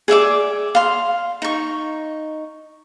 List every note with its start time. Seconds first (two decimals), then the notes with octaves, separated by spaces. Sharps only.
0.08 G#4 D5 E5 D6
0.75 F5 C6
1.42 D#4 C#6